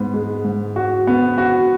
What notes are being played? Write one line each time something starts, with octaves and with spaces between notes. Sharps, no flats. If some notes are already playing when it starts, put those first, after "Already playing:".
Already playing: G#2 B3
G#3
G#2
F#4
B3
F#4